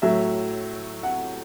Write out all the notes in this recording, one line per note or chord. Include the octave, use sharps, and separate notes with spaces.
A2 F#3 E5
F#5